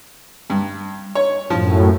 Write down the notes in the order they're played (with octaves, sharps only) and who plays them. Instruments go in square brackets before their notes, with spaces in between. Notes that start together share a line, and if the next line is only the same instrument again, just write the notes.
[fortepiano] G2
C#5
[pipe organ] F#2 A2 [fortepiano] F3